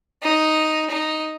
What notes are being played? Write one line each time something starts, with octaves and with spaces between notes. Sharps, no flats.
D#4
D#4